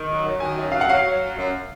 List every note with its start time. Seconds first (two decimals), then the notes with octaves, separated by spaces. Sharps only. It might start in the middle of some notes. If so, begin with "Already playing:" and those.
Already playing: D#3
0.09 F#3
0.25 F#2
0.40 D#3 G#5
0.56 F#2
0.72 F#3 F5
0.81 F#5
0.88 F#3 F5
1.05 F#3
1.21 F#2
1.37 F#2